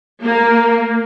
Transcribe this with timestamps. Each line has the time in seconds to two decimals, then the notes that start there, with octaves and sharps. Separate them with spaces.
0.23 A#3